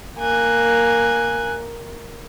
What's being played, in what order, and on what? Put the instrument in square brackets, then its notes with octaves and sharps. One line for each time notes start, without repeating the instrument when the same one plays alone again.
[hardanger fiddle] A#3 [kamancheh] G#5 F#6